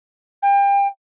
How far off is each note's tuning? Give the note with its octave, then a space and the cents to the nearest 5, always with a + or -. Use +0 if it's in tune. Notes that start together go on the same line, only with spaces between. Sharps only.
G5 +30